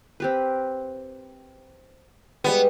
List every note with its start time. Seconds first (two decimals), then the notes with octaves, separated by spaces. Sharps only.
0.20 C4 G4 B4
2.44 G3 G#3 B3 C#6